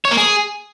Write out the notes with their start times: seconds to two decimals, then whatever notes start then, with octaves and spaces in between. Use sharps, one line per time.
0.05 C#5
0.11 A#3
0.17 G#4